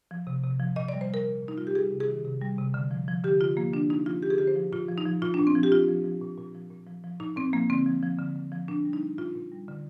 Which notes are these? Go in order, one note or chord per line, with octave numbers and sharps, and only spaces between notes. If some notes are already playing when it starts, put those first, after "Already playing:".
F3
C3
C3
F3
A#2 D#5
D5
G3
C5
G3 A#4
A#2
A#2
D#4
G3 F4
G4
G3 G#4
C3
G#4
D#3
C3
G3
C3
D3
F3
F3
D3 G4
D3 F4
F3 A#3
D3 D4
F3 D#4
F3 F4
D3 G4
G#4
D3 G4
C5
F3
A#2 F4
F3
D#4
F3
A#2 F4
D4
A#2
C4
F3
G4
A#2 F4
F3
F3
A#2
A#2
F3
A#2
F3
F3
A#2 D#4
A#2 C4
F3 A#3
D3 C4
F3
F3
D3
D3
F3
A#2 D4
G3
D#4
G3
A#2 F4
A#2
G3
D3